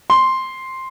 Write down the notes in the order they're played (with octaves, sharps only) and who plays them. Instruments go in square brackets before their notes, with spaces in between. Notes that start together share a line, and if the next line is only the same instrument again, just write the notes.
[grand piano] C6